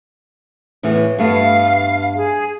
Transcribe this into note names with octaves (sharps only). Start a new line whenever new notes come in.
E2 A2 E3
G2 A3 B3 F5
G#4